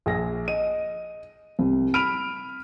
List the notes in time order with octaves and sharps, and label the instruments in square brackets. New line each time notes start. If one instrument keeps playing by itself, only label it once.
[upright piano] A#1 G#4 A#6
[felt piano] D#5 [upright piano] D#7
[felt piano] C2
[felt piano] B5 F6 [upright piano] D7 D#7 F7